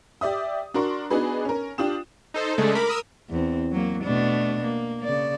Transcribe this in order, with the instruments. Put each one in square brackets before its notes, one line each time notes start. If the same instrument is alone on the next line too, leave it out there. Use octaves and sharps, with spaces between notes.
[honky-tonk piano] G4 D5 E5 D#6
D4 F#4 A#4 C6 C#6
B3 D4 D#4 F#4 G#4 B4
C#4 A#4
D4 F4 G4 D#6 E7
[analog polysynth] D#4 A4 C5
C#3 G#3 A3 D4 G#4 A4
A#4 B5 D6
A#4 D#6 E6
[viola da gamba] E2 C4
F#3 A#3
B2 A3 D4
A#3
C#3 D5